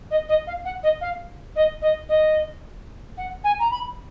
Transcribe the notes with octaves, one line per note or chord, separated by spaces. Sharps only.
D#5
D#5
F5
F#5
D#5
F5
D#5
D#5
D#5
F#5
G#5
A#5
B5